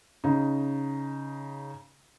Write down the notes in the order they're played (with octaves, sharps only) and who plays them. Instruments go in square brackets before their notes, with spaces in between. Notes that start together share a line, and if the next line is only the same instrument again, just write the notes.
[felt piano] C#3 D#4